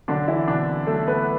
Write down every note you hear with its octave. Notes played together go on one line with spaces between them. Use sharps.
B1 D3 D4
E3 E4
B2 D3 D4
B1 A3 A4
B3 B4